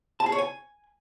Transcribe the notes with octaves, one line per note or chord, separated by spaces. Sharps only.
A5
G#4
C#5
G#5